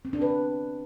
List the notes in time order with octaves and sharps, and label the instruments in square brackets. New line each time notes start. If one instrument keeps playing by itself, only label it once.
[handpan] C4
D4
B4